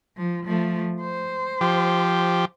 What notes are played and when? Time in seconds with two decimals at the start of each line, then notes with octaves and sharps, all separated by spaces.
0.17 F3
0.46 F3 A3
1.01 C5
1.61 F3 G4